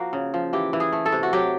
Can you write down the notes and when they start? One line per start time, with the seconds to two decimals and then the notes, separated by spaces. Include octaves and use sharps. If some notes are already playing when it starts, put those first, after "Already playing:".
Already playing: F3 A#3 F#4
0.13 C#3
0.34 F3
0.53 E3 G4
0.73 E3
0.80 G#4
0.92 A3
1.06 A4
1.12 C3
1.23 F#4
1.33 F#3 G4